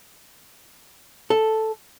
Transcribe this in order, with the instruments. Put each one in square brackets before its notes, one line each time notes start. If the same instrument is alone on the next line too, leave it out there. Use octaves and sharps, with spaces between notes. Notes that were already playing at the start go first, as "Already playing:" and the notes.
[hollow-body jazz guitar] A4